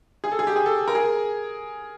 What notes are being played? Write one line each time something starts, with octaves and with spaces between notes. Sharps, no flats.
G#4
A4
G#4
G4
G#4
A4
A#4
G#4